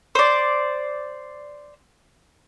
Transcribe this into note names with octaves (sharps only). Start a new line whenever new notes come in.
C5 D5